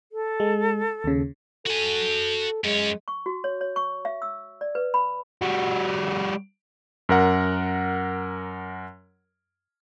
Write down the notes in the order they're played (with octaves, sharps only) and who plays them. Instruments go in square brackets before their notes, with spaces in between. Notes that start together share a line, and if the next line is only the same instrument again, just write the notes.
[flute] A4
[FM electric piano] G#3
D#2 C#3
[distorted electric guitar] F#4 G#5 [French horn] A4
[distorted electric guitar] F#2 C#4 [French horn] G#3
[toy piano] C#6
F#4
C#5
C#5
C#6
E5
E6
D5
B4
B5
[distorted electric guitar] G3 F#4
[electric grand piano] F#2 A#4 F#5